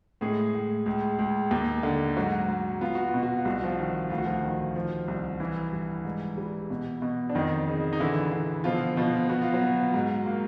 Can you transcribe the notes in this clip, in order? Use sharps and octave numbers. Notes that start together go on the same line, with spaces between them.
A2 G#3 G#4
A2
C#2
C#2
D#2
D3
G#2 F#3 F#4
G#2
B3 F4
F#4
F4
B2
F#4
F4
C2
F#4
F3 F4
D#3
D2 F4
F#4
F3 F4
D#3
F3
C2
E3 E4
G2
G#2
G3
B2
B2
D4
F2 D#3 D#4
C#3
D#4
D3 E3 E4
D3
B2 F3 F4
B2 F3 F4
B3 F#4
F4
F#3 F#4
B3
G#2
A#3